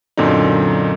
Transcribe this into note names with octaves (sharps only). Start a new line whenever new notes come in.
F#2 A#2 D3 C4 D#4